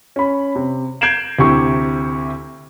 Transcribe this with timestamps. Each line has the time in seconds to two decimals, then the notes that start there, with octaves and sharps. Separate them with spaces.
0.16 C#4 B5
0.56 C3
1.01 G6 G#6 C7 D7 E7 F#7
1.39 D2 C3 E4 G4 C#6